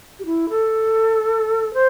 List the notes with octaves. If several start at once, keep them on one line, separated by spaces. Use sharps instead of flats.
G4
E4
A4
C5